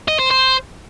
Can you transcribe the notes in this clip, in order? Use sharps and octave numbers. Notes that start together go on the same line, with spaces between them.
D#5
C5
C5